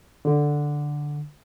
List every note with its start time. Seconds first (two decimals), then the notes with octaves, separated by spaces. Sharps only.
0.25 D3